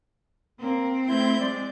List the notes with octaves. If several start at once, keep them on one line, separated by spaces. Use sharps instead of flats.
A#3 C4
A3 E4 C5 G6
G#3 D5